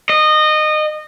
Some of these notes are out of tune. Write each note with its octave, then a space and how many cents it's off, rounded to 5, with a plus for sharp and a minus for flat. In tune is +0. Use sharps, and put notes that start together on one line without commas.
D#5 -20